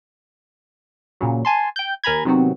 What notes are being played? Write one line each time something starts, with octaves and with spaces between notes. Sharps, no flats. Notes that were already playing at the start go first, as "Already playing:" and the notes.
A#2 C#3 F#3
G#5 A5 C6
G5 G6
D#2 A#4 G#5 A#5 B5 G#6
C3 D#3 F#3 B3 C4 F#4